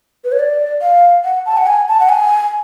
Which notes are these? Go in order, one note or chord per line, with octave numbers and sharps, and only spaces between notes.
B4
C#5
D5
F5
F#5
A5
F#5
G#5
A5
F#5
G#5